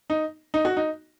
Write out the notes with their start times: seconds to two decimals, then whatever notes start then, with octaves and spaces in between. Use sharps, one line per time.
0.10 D#4
0.54 D#4
0.65 F#4
0.77 D#4